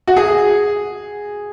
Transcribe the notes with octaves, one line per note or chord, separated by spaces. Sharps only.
F#4
G#4